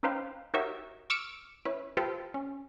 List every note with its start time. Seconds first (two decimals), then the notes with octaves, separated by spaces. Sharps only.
0.03 C#4 D#4 B4 C5 F5 G5
0.54 D#4 F#4 G4 A#4 C#5 E5
1.10 C#6 D6 E6 F6 C#7 D7
1.65 C#4 E4 B4
1.97 F4 G4 A4 B4 C5
2.34 C#4